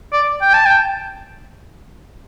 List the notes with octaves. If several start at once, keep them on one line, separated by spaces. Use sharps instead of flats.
D5
G5
A5
G5